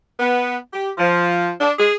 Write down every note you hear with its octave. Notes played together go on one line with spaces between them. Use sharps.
B3
G4
F3
D4
G#4